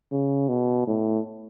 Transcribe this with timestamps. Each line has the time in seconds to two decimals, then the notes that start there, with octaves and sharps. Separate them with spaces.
0.12 C#3
0.49 B2
0.87 A2